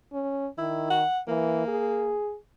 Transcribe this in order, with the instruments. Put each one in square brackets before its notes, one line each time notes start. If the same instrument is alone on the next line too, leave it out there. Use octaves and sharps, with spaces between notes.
[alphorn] C#4
[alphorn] D#3 [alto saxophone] E4
[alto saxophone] F#5
[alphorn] E3 [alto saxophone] A#3
[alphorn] G#4